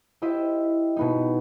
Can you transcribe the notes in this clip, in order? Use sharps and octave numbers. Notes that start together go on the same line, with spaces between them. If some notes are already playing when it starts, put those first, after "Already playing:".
E4 G4 C5 D#5 E5
B2 B3 D#4